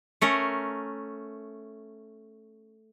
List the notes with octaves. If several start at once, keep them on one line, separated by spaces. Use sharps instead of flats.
A3 C#4 A#4